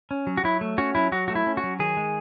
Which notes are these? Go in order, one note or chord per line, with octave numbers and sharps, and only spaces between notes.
C#4
F#3
F#4
F#3 E4
A3
C#4 F#4
F#3 E4
F#3 F#4
A3 F#4
E4
C#4
F#4
F#3
D#3 G#4
G#3